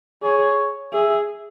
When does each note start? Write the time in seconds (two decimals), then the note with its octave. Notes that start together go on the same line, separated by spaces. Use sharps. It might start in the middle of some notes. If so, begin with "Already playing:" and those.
0.23 G#4 C#5
0.93 G#4 E5